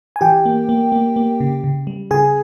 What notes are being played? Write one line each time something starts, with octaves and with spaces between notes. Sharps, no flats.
G#5
E3 G4 G5
A#3
A#3
A#3
A#3
C#3
C#3
G3
C#3 G#4 G#5